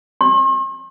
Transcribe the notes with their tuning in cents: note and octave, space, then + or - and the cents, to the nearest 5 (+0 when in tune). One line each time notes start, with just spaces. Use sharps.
C6 +45